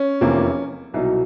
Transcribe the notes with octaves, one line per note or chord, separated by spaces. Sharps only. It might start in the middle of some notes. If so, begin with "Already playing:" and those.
Already playing: C#4
F1 E2 C3 F3 A#3
C2 B2 F#3 D#4